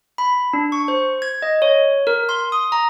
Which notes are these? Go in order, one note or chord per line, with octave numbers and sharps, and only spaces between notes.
B5
D4
C#6
C5
G#6
D#5
C#5
A#4
C6
D#6
A#5